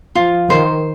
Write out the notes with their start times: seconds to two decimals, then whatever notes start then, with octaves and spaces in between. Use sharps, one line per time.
0.15 F3 F4
0.50 D#3 C5